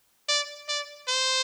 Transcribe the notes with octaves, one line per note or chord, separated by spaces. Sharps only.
D5
D5
C5